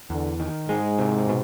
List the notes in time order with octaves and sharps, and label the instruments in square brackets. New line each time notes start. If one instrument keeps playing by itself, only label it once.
[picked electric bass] E2 [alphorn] D3
[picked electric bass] D#3
[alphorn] G#2 [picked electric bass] G#3
[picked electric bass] C3
B2